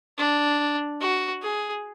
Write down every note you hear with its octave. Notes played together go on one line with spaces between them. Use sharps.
D4
F#4
G#4